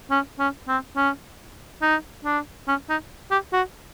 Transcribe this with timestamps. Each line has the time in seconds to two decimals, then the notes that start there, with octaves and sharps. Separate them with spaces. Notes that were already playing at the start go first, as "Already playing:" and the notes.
0.10 C#4
0.39 C#4
0.68 C4
0.96 C#4
1.82 D#4
2.25 D4
2.68 C#4
2.89 D#4
3.31 G4
3.53 F#4